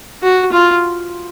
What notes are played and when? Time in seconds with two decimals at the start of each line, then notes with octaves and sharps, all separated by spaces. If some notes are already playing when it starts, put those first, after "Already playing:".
0.23 F#4
0.52 F4